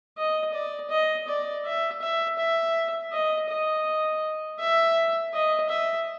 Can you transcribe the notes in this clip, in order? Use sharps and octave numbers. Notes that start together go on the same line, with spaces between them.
D#5
D5
D#5
D5
E5
E5
E5
D#5
D#5
E5
D#5
E5